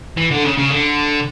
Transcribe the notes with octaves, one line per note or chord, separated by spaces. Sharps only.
E3
D3
C#3
C#3
D3